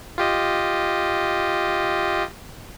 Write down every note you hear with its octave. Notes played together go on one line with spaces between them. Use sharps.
F4 G4 D#5